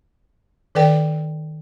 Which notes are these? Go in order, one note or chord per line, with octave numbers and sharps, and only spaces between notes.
D#3 A4 B4 D5 G5